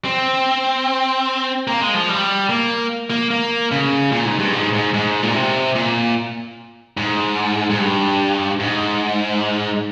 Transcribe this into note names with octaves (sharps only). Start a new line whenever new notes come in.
C4
A#3
G#3
F3
G3
A#3
A#3
A#3
C#3
A#2
G#2
G2
G#2
G#2
G#2
A#2
C3
A#2
G#2
G#2
G2
G#2